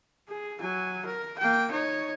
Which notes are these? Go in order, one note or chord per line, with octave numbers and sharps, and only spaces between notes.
G#4
F#3 G#5
A#4
A#3 G5
D#4 C#5